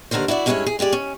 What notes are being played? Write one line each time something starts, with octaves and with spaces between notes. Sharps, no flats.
D#2 G#2 D3 A#4 C5
E4 F#4 C#5 D5
G2 G#3 A3 C#4 E4 C#5
G#4
G#3 G4 G#4 D5
C#4